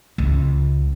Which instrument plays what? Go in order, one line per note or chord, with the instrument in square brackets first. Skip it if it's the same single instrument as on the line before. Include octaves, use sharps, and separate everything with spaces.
[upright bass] C#2